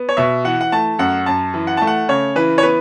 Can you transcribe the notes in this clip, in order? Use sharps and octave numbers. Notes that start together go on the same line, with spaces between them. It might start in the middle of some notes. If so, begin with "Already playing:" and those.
Already playing: B3
C#5
B2 E5
E3 F#5
F#5
A3 A5
F#2 F#5
F#2 A5
E3
F#5
A3 A5
F#5
C#3 C#5
E3 B4
C#5
B3 B4